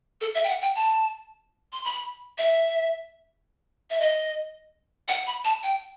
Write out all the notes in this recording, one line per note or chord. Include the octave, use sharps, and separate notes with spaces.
A4
E5
G5
F#5
G5
A5
C6
B5
E5
E5
D#5
F#5
B5
A5
G5